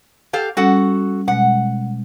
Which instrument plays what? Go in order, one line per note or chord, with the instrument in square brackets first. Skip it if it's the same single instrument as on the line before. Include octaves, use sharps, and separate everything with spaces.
[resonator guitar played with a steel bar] G4 A4 F5
[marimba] G3 C#4 [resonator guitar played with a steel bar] F#4 A4 F#5
[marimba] B2 G#3 [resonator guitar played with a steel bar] F#5